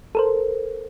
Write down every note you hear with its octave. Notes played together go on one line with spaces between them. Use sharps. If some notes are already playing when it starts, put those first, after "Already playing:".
A4 A#4 C5